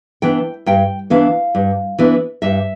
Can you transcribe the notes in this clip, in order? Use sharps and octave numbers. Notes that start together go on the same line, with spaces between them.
E3 B3 D4 G5
G2 G5
E3 B3 D4 F5
G2
E3 B3 D4
G2 E5